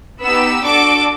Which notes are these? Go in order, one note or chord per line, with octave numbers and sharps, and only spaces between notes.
B3 D#4 G4 E6
D4 F#4 A4 D6